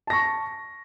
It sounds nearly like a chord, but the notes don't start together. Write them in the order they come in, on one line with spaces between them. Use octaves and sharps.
A5 A#6 C#6